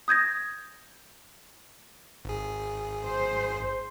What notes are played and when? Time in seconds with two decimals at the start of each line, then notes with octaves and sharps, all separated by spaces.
0.08 D#6 G6 G#6 A#6
2.25 G#1 G#4
3.05 C5